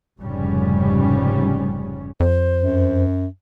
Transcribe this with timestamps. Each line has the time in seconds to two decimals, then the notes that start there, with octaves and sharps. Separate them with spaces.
0.19 F1 G#2 C#3 G3 C#4
2.20 F2 C5
2.62 F#2